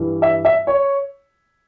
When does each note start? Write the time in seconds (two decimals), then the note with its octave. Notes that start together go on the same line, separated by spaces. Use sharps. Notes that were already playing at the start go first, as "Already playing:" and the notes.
Already playing: G2 E3 G3
0.22 E5
0.45 E5
0.67 C#5